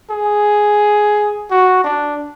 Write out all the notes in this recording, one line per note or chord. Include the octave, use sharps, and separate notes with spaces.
G#4
F#4
D4